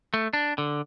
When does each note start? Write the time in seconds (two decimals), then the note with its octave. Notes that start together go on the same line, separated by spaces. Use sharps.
0.14 A3
0.33 D4
0.58 D3